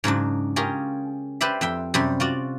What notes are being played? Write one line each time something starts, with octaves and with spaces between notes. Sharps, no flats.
G#2 C#3 F#3 D4
C#4 F4 G4 G#4 A#4
G4 B4 C5 D5 E5
F2 E5 G5
F#2 C3 G3
F4 F#4 D5